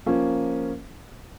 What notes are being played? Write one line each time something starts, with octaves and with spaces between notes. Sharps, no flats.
F3 A#3 C#4